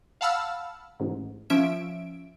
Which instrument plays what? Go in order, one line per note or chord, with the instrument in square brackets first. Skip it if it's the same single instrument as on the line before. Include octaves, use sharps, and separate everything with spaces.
[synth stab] F5 F#5 A5 B5 E6 F6
A1 G#2
F3 C#4 E5 D7